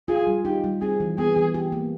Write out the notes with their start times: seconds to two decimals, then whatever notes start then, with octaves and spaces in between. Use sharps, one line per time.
0.08 F4 G#4
0.27 G3
0.45 D#4 G4
0.64 G3
0.81 C4 G#4
1.00 E3
1.18 B3 G#4
1.37 E3
1.54 G4
1.72 A#3